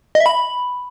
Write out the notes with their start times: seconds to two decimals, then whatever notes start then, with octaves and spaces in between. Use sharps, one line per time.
0.15 D#5
0.20 E5
0.26 B5